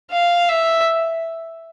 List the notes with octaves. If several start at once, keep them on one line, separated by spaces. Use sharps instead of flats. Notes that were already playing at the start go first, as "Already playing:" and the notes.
F5
E5